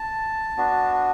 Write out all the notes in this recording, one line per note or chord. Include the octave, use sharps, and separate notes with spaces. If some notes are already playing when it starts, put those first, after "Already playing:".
Already playing: A5
B3 D4 F#4